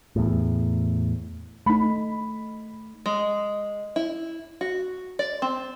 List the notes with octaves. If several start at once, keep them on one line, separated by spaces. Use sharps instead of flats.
E2 A2
A3 D#4 B5
G#3
E4
F#4
D5
C4